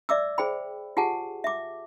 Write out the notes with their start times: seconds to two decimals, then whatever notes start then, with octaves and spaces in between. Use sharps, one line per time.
0.09 D5 E5 D6 E6
0.38 G#4 C5 G5 B5
0.97 F4 G4 G#4 F#5 G#5 A5
1.44 E5 D6